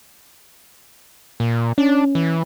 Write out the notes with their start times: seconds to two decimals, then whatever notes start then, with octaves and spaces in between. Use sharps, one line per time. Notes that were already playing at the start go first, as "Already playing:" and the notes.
1.40 A#2
1.78 C#4 D4
2.15 E3